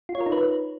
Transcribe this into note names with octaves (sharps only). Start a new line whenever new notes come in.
F4
C#5
A#4
D#4
B4